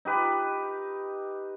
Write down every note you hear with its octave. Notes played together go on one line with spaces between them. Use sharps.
D#4 G4 B4